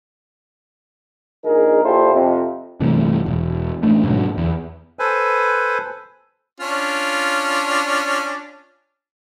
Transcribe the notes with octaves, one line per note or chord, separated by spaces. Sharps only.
A#1 D#4 G#4 A#4
A#2 E4 F4 G4 A4 C5
F2 C3
G1 C3 E3 A3
E1
A1 A3 D4
G#2 B2 D3 F#3
E2
A4 B4 C5 G#5
C#4 D4 F4